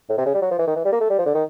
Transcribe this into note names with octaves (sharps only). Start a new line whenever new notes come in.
A2
C3
C#3
G3
F#3
F3
E3
D#3
E3
G3
A#3
A3
G3
F3
D3
D#3